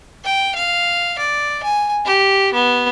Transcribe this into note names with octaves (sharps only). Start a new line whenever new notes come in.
G5
F5
D5
G#5
G4
B3